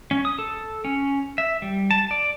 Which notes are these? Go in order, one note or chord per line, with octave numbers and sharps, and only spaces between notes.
C#4
D#6
A4
C#4
E5
G3
A5
D5